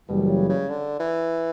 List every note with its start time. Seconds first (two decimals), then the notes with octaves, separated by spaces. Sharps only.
0.09 F#1 F#2 B2 E3 G3
0.30 C#3
0.49 C#3
0.69 D3
0.99 E3